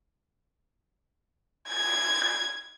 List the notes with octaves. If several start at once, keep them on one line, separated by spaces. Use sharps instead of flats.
G#6